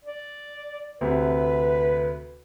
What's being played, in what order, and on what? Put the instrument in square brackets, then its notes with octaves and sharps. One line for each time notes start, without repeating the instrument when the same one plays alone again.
[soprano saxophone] D5
[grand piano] D2 C3 [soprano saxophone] B4